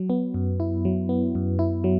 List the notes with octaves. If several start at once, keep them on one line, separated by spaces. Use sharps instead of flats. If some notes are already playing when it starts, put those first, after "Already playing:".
Already playing: F#3
B3
F#2
E4
F#3
B3
F#2
E4
F#3